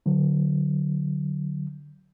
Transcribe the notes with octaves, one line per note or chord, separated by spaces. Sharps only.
D3 F#3